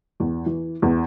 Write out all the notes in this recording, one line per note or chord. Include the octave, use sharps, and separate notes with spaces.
E2
E3
E2